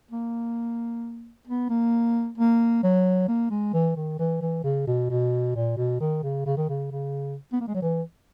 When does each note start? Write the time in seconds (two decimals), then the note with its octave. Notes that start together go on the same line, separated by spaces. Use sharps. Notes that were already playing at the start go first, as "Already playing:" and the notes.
0.11 A#3
1.47 B3
1.70 A#3
2.38 A#3
2.83 F#3
3.28 A#3
3.51 G#3
3.73 E3
3.96 D#3
4.19 E3
4.41 E3
4.64 C#3
4.87 B2
5.10 B2
5.55 A#2
5.77 B2
6.00 D#3
6.23 C#3
6.46 C#3
6.57 D#3
6.69 C#3
6.91 C#3
7.53 B3
7.60 A#3
7.67 G#3
7.74 F#3
7.82 E3